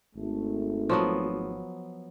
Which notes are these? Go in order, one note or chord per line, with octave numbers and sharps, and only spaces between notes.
G#1 A3
F3 F#3 B3